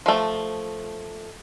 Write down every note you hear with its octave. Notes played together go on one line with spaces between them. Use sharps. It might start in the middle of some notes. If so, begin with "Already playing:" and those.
F3 A3